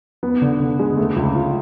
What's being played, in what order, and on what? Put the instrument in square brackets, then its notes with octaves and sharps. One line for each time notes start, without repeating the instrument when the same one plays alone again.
[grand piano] B3
D3
D3
G#3
A3
C#2
F4